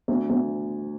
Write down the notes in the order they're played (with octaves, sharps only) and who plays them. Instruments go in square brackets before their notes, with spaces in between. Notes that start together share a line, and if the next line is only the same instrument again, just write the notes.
[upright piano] D2
D2